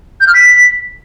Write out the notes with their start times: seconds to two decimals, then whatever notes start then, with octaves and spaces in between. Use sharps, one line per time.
0.20 G6
0.27 F6
0.34 B6